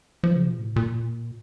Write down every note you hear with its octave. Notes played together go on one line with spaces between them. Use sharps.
F3
C#3
B2
A2
A#2